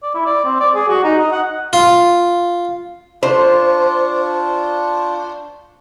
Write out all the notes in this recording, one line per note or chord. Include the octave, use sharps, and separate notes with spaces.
D5
E4
D5
C4
D5
G#4
F#4
D#4
D#5
F#5
F4
D4 F4 C5 C#6